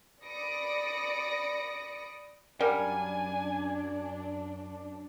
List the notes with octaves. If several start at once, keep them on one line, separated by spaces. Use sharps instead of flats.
D5 B5 D#6 A#6 C#7 D7
F#2 G3 D4 A#4 F#5 G#5